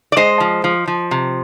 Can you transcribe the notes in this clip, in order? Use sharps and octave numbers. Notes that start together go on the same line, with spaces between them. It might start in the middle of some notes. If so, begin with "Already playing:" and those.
D5
G#3 C5 D#5
F3
F3
F3
C3